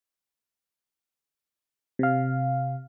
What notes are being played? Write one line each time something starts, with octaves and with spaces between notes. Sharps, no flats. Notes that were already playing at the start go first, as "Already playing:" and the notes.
C3 F5